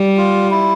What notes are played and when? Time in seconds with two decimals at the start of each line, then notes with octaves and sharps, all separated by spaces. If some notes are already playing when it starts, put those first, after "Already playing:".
Already playing: G3
0.17 F4
0.51 E4